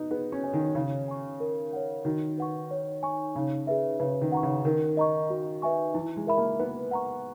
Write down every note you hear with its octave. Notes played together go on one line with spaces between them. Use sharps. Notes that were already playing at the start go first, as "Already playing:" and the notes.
Already playing: B3 D#4
B3 G#4
C#4
C#5 G#5
D#3
C#3 C#5
G#5 C#6
A#4
C#5 F#5
D#3 F#4
B4 F#5 C#6
C#5
G#5 C#6
C#3 D#4
G#4 B4 E5
C#3 B4
D#3
F#5 A#5 C#6
C#3
D#3 A#4
D#5 A#5 C#6
F#4
B4 E5 G#5 C#6
E3 E4
G#3
A#4 E5 B5
A#3
B3 B4
F#5 A#5 C#6